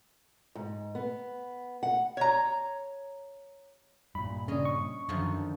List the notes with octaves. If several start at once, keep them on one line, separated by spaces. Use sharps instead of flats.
G#2
B3
F#5
C#5 A#5
G2 A#2 B5
C#3 C#4 D4 D#5
C#6
F#2 D3 D#3 F3